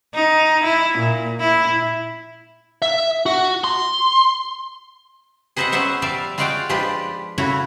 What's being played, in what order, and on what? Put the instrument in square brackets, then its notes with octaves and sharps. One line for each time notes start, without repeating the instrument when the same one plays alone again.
[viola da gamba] D#4
E4
A#2
E4
[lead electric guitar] E5
F#4
C6
[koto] G#4 B4 C5 D#5 E5 F#5
F#3 B3 C#4 C5 E5 F#5
F3 G3 D5 E5 F5
G#3 F4 F#4 D5 F5 G5
F3 G#3 D4 F4 G4 B4
C#3 A3 E4 F#4 C#5